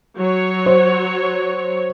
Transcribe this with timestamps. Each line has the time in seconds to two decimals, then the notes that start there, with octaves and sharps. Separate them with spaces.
0.17 F#3 C#5
0.66 C5